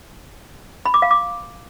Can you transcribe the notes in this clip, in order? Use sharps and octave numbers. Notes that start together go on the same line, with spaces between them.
B5
D6
F5
D6